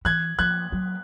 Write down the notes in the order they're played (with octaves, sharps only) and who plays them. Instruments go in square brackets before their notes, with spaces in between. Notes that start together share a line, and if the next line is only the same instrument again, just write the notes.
[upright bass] E3 [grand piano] F#6 G#6
[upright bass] F3 [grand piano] F#6 G#6
[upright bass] F#3